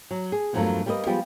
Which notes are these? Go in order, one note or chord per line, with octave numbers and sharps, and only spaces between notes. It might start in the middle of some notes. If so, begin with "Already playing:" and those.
F#3
G#4
E2 G2 F3 F#3 A3 A#3
G3 A#3 B4 C5 D#5
F3 G3 G#3 B3 F4 G4